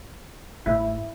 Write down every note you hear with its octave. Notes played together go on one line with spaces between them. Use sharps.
G1 G#2 A3 E4